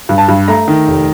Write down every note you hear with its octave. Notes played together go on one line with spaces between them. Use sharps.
G2
A5
G2
A3 A#5
D#3
F1